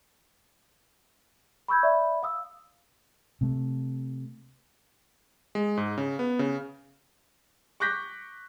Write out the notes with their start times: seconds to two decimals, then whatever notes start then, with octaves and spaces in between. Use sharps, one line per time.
1.68 B5 C#6 E6 G6 G#6
1.83 D5 E5 B5
2.23 F5 D#6 E6
3.41 C3 A3
5.55 G#3
5.77 G#2
5.98 C#3
6.19 B3
6.39 C#3
7.80 C#6 D6 F#6 G6 A#6 B6